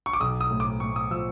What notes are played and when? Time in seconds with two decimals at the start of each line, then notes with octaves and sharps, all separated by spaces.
0.06 C#6
0.13 D6
0.20 B1 D#6
0.41 D#6
0.50 A2
0.60 D6
0.80 A2 C#6
0.96 D#6
1.11 F3 E6